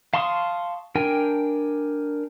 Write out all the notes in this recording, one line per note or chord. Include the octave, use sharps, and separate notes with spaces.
F5 A5 C6 C#6 D#6
D4 A#4 G5 G#5